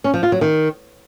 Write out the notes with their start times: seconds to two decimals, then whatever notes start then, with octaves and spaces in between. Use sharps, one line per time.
0.04 C#4
0.14 F3
0.23 F4
0.32 F#3
0.41 D#3